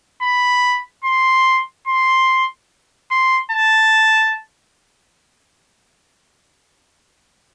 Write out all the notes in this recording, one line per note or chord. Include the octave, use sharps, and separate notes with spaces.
B5
C6
C6
C6
A5